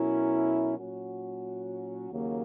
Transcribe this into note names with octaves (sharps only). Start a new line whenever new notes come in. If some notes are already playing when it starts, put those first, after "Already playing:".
Already playing: B2 F#3 C#4 E4 A#4
A#2 F#3 C#4 F#4
D#2 C#3 F#3 A#3